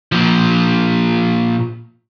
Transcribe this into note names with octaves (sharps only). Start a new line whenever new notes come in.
A#2 F3